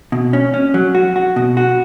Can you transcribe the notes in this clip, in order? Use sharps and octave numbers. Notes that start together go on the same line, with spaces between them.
B2
C#4
C#4
F#3
F#4
F#4
B2
F#4